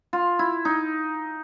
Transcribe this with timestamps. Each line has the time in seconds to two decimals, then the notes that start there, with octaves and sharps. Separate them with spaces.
0.13 F4
0.39 E4
0.65 D#4